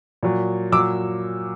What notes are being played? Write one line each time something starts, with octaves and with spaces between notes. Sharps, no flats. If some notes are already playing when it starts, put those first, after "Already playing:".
A#2 F#3
A#2 F#3 D6 E6